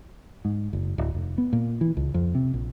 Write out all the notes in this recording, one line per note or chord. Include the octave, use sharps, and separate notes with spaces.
G#2
F#1
D1
F1
B3
A#2
E3
C#2
F2
C3
A#1